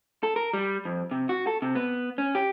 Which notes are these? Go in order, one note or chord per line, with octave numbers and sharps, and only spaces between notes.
A4
A#4
G3
F2
C3
F#4
A4
C3
B3
C#4
G4